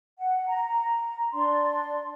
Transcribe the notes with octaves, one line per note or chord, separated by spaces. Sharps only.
F#5
A#5
D4 D5 C6